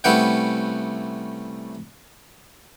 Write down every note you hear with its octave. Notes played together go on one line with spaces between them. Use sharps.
C2 A3 C#4 B4 F#5 G5